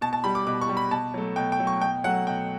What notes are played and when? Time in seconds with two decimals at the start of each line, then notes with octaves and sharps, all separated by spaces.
0.01 B2 A5
0.13 A5
0.24 G3 B5
0.35 D6
0.47 B2 D6
0.62 C#6
0.69 G3
0.77 B5
0.91 B2 A5
1.14 F#3 A3
1.36 B2 G5
1.52 G5
1.60 F#3 A3
1.67 C#6
1.82 B2 G5
2.04 F#3 A3 F#5
2.27 B2 G5